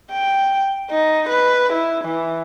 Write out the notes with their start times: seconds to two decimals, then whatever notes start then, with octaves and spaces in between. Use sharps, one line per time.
0.11 G5
0.91 D#4
1.29 B4
1.73 E4
2.05 E3